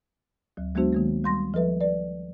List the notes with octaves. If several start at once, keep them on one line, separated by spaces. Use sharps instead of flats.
D2 F#3
F#3 G#3 B3 D4 F#4 C5
D#3 G#3 A#3
G3 C6 A#6
F3 A4 B4 E5
B4 D5